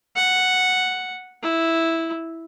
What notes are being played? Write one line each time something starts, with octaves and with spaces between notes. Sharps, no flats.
F#5
E4